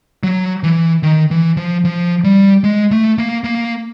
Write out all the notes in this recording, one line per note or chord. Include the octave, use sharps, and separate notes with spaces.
F#3
E3
D#3
E3
F3
F3
G3
G#3
A3
A#3
A#3